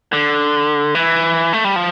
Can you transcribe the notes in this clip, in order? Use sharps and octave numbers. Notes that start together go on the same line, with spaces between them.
D3
E3
A3
G3
F3